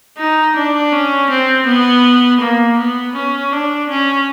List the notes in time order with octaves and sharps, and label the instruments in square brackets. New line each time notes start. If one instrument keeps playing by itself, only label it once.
[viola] D#4
D4
C#4
C4
B3
A#3
B3
C#4
D4
C#4